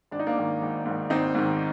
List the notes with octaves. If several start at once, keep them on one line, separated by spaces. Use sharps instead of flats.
G#1 D4
D#4
A#3 D4
G#2 D#3
G#1
G#2 D#3
G#1 C4 D#4
G#2 D#3